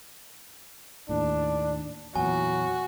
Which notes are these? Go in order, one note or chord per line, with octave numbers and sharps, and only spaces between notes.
D#2 A2 D4
E2 A#2 E3 F#3 F#4 G#5